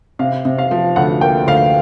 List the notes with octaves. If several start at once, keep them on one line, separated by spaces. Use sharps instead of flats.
C3 F5
C3
F5
F3
D2 F#5
A#3 G5
D2 F5